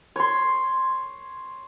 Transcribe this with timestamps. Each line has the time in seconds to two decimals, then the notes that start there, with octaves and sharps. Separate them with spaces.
0.16 C#5 C6